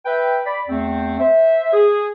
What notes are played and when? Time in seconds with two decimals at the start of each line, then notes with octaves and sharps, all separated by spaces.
0.06 B4 E5 G5
0.44 D5 B5
0.69 E2 A3 C4
1.19 C5 E5
1.73 G#4